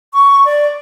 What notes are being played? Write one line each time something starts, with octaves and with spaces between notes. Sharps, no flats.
C#6
D5